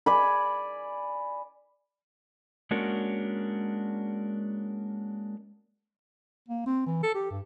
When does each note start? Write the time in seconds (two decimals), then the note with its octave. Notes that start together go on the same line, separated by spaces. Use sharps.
0.06 D5 G#5 B5
2.71 G#3 A#3 C#4 D4 F#4 A#4
6.48 A#3
6.66 C4
6.86 E3
7.03 A4
7.15 G4
7.30 G2